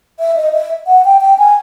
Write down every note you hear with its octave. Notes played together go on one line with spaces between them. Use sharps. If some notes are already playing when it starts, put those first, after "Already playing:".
E5
D#5
E5
F#5
G5
G5
G#5